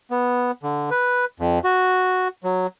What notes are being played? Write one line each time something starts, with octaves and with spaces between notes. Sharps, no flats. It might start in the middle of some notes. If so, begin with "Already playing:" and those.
B3
D3
B4
F2
F#4
F#3